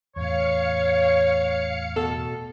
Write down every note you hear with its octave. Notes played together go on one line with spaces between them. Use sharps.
E2 A2 C#5 F5 C#7
B2 A4